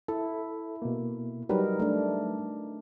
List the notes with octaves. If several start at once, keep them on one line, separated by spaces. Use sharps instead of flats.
E4 A4
B2 A#3
F#3 G3 D#4 A#4 B4
A3 D4